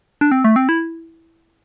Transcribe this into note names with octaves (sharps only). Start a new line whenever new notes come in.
D4
C4
A3
C4
E4